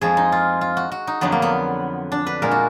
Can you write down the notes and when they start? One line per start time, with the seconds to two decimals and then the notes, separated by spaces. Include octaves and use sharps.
0.01 F2 F3 G#3 G#4
0.17 D#4
0.32 F4
0.61 F4
0.77 F#4
0.92 F#4
1.07 D#4
1.21 F2 D3 F#3 B3
1.32 A#3
1.42 B3
2.12 D4
2.27 B4
2.42 A#2 G#3 A#4
2.51 F#4